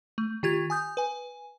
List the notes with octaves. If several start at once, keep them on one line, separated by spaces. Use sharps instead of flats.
A3
D#3 F4 G4 G#6
G#5 D#6 G6
B4 G#5